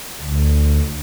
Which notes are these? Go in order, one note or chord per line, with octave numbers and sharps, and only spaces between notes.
D2